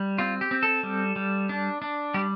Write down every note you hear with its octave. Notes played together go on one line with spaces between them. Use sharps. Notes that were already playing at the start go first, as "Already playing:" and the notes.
Already playing: G3
C4 F4
G4
C4
A4
G3
G3
D4
D4
G3 G4